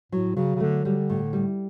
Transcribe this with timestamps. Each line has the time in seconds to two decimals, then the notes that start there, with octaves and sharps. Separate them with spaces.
0.12 A2 F#3
0.36 C#3 F#3
0.55 C#3
0.60 D3 A3
0.85 D3 G3
1.09 A2
1.33 G3